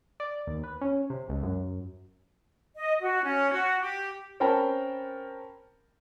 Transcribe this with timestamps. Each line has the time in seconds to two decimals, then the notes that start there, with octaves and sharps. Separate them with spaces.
0.20 D5
0.47 D#2
0.64 B4
0.81 C#4
1.10 C3
1.29 C#2
1.43 F#2
2.76 D#5
3.02 F#4
3.24 C#4
3.51 F#4
3.81 G4
4.40 C4 C#4 A#4 G5 A5 B5